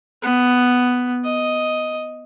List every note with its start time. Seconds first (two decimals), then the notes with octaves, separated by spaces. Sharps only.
0.22 B3
1.24 D#5